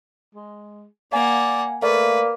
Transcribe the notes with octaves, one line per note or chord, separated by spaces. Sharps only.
G#3
A#3 D5 F5 F#5 G#5
A3 A#3 B4 D5 F5